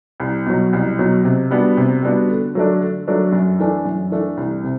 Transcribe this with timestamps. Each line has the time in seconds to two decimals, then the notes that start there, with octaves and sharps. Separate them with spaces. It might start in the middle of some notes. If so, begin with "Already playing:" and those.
0.20 C2
0.46 B2 F#3
0.73 C2
0.99 B2 F#3
1.24 C3
1.51 G3 B3 D4 F#4
1.77 C3
2.02 G3 B3 D4 F#4
2.29 D3
2.55 F#3 A3 D4
2.81 D3
3.08 F#3 A3 D4
3.32 F#2
3.59 E3 A3 D4
3.85 F#2
4.11 E3 A3 D4
4.37 C2
4.63 C3